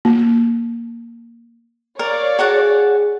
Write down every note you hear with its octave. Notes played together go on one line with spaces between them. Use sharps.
A#3
A#4 C#5 D5 F5
F#4 G#4 A4 F#5